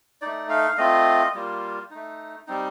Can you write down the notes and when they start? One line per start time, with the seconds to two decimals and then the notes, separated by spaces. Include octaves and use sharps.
0.22 A3 D#4 D5
0.49 F5
0.78 A3 C4 F4 D#5
1.34 G3 A#3 F4
1.90 A3 D#4
2.47 G3 C4 D#4